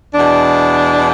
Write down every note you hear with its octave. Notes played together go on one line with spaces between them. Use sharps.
E2 B2 D4